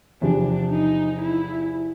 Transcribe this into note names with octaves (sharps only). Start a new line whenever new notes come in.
E2 C3 F3 D4
D#4
E4